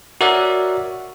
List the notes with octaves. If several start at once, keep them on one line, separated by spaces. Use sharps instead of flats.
F#4 A#4 C#5 D5 E5 F#5